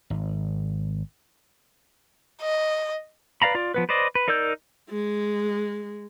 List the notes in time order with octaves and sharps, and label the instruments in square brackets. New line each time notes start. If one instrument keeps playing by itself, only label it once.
[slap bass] G#1
[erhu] D#5
[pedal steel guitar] B4 D5 F5 A#5 B5
F4 D5
F3 B3 B4
B4 C5 D5 D#5
B4
D#4 A#4 D5 E6 G6
[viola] G#3